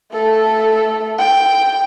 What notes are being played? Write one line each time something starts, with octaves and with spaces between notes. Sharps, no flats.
A3 A4
G5